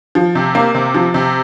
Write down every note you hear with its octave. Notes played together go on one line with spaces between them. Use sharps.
F3
C3
A#3
C3
F3
C3